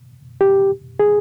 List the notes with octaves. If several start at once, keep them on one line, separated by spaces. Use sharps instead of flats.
G4
G#4